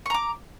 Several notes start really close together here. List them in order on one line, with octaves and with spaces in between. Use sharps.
C#6 A#5 D6